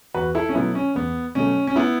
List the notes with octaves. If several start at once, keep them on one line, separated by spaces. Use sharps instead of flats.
E2 F#4 B4
E4 A4
C#4
B2 F#3 A3 B3 E4
C#4
E2 B3
B2 F#3 A3 C#4
C#4
B3 E4